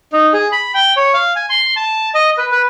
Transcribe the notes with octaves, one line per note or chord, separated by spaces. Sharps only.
D#4
G#4
B5
G5
C#5
F5
G#5
C6
A5
D#5
B4
B4